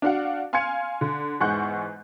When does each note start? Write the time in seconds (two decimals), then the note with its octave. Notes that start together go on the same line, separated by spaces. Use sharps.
0.02 D4 F#4 F5 F#5
0.53 F5 G#5 C6 F6 G#6 C#7
1.01 D3
1.40 E2 G#2 F#5 C#6 F#6 G6